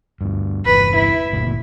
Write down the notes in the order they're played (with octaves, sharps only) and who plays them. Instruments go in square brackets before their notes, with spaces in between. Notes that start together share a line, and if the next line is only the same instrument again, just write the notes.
[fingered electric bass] D2 G2
[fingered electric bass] G1 E2 [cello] B4
[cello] E4
[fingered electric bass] F#1 D2 A#2